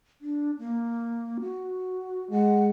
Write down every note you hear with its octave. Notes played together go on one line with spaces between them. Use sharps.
D4
A#3
F#4
G#3 F#5